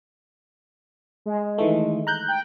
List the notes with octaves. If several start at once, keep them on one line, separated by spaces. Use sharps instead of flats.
G#3
D#3 E3 A3
A#5 F#6 G6
G5